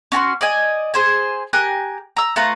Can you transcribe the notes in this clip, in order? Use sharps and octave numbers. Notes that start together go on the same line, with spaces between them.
C#4 F#4 A5 C6
D5 D#5 G#5
G#4 C5 G#5
G4 A#4 G#5 F#6
A#5 E6
A3 F4 B4 A#5